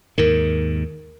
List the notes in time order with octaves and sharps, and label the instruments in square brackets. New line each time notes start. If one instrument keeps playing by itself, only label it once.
[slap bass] D#2 G#2 D#3 [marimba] A#4